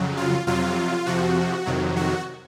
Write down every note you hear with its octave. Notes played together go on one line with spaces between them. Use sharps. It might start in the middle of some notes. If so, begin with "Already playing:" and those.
Already playing: F2 C#3 F#3
F4
F2 C3 F#3 F4
F2 C3 F3 F#4
F2 C3 D#3 F#3
F#4